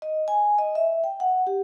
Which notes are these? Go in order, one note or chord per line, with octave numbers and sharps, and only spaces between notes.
D#5
G#5
D#5
E5
G5
F#5
G4